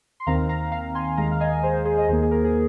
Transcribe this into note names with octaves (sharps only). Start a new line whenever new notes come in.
C6
D#2 D#3 C4 F5 A#5
F5 A#5
F5 A#5
G#5 C6
D#2 D#3 G#3 F5 A#5
F5
D#5 G#5
G#4 C5
G#4 C5
D#5
D#2 D#3 A#3 G#4 C5
G#4
A#4
G#4